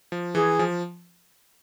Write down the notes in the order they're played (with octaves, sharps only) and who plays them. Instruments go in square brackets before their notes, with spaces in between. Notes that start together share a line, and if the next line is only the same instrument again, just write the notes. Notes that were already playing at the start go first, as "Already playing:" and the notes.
[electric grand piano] F3
[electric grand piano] E3 [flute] G#4
[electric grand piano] F3